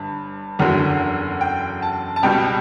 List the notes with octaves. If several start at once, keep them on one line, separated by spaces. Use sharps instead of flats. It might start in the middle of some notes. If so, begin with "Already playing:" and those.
Already playing: G1 G2
F#1 E2 D3 F#3
G5
A5
A5
C#2 B2 G3 G5